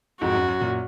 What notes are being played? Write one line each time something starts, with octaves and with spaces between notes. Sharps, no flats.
F2 G#2 F#4
F#2
F#2
F#2 A#2